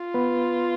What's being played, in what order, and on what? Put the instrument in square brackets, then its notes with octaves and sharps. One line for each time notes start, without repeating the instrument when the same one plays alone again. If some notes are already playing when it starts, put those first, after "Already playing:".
Already playing: [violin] F4
[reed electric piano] B3 B4